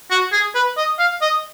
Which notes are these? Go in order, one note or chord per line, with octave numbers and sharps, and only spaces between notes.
F#4
G#4
B4
D#5
F5
D#5